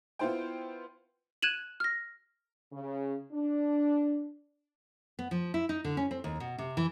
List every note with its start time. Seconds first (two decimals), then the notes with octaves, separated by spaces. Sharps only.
0.19 B3 E4 F4 C5 G5
1.42 F#6 G#6 D#7 E7 F#7
1.80 F6 A#6
2.72 C#3
3.32 D4
5.19 B3
5.31 F3
5.54 E4
5.69 D#4
5.84 D3
5.97 C#4
6.11 C4
6.24 D#2
6.40 B2
6.58 C3
6.77 E3